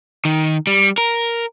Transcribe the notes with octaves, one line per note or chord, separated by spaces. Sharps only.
D#3
G3
A#4